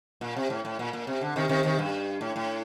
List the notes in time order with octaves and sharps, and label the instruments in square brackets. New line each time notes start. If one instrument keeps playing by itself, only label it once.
[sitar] A#2
C3
A2
A2
A#2
A#2
C3
D3
C3 D#3
C3 D#3
C3 D#3
G2
A2
A2